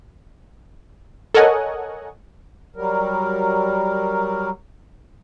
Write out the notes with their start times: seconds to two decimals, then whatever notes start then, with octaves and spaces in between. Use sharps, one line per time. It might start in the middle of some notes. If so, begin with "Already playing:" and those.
1.35 A4 A#4 C#5 D#5 F#5 G#5
2.76 F#3 G3 A#4